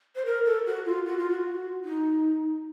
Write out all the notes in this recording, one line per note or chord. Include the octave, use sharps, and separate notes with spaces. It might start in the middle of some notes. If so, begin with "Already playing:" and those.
C5
A#4
A4
F#4
F4
F#4
F4
F#4
D#4